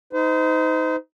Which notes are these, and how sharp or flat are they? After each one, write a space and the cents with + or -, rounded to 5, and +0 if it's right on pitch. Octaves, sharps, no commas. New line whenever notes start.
D#4 +20 C5 -35